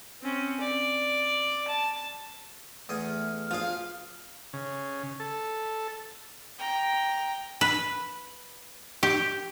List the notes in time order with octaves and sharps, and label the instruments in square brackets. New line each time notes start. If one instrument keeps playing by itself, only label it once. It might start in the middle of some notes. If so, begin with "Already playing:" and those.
[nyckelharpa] C4 C#4
D5
A5
[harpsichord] E2 G#4 G#5 [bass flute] A3 [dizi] F6
[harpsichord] F3 G#4 [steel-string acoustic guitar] F4 F5
[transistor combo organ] C#3
A4
[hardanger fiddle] G5 A#5
[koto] B4
G4